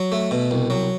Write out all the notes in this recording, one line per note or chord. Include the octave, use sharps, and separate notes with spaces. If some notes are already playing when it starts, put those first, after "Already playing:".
Already playing: F#3
A3
B2
C2
F#3